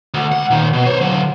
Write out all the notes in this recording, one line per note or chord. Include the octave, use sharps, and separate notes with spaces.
D2
C#2 F#5
A#2 D#3
B2
C5 C#5
D3 F#3